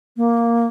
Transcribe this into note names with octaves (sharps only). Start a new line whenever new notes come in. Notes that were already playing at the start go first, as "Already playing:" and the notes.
A#3